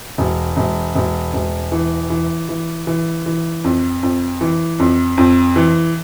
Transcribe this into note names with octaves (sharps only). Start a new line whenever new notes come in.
E1
E1
E1
E1
E3
E3
E3
E3
E3
F2
F2
E3
F2
F2
E3